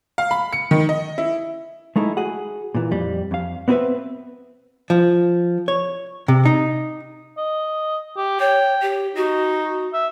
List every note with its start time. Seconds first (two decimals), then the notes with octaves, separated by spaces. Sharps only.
0.18 F5
0.31 B5
0.53 C#7
0.71 D#3
0.89 D#5
1.18 E4
1.96 G#3 A3 D#4 E4
2.17 F#4 G#4 F#5
2.75 A#2 E3
2.91 F2 G3
3.31 F2 F5
3.68 B3 C4 E4 G#4 B4 E5
4.90 F3
5.68 C#5
6.28 C3
6.46 D#4
7.37 D#5
8.17 G4
8.40 C#5 G5
8.82 G4
9.15 D#4 F#4
9.93 E5